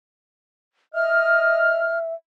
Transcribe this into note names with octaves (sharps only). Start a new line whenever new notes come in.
D#5 E5 F6